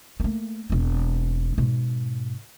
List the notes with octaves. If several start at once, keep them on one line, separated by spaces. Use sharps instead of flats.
A3 A#3
E1 C4
G#2 B2